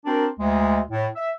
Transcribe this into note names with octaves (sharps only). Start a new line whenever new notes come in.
C4 D4 F#4 A#4
D2 G#3
A2
E5